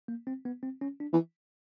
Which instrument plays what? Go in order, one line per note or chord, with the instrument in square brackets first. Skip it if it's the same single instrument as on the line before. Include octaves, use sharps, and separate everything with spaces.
[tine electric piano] A#3
C4
B3
C4
C#4
D4
[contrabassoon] E3